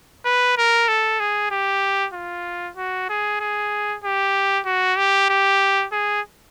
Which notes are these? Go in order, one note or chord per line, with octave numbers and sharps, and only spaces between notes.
B4
A#4
A4
G#4
G4
F4
F#4
G#4
G#4
G4
F#4
G4
G4
G#4